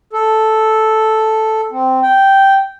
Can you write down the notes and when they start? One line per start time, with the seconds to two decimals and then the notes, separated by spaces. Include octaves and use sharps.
0.13 A4
1.72 C4
2.03 G5